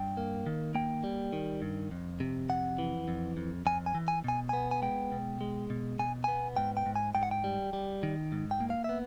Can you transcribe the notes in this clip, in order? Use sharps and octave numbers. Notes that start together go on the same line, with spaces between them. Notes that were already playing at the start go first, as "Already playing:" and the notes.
Already playing: G2 G5
A#3
D#3
A#3 G5
G3
D#3
G2
F2
C3
F2 F#5
E3
F2
F2
F2 G#5
G#5
E3
G#5
B2 G#5
B3 G#5
G#5
G#3 G5
B2
G#3
B2
B2 G#5
B3 G#5
G#2 G5
G5
G#2
G#5
G#2 G5
F#5
G5
G3
G3
D#3
G#2
G5
A#3
F5
B3 E5